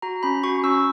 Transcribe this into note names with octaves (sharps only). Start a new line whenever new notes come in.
F#4 A#5
C#4 B5
F#4 C#6
C#4 E6